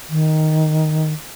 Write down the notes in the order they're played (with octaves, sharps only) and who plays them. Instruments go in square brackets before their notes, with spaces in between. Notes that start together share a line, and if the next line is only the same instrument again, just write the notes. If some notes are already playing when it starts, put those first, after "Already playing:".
[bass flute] D#3